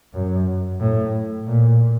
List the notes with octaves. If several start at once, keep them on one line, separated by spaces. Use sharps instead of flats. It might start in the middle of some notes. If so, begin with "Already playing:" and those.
F#2
A2
A#2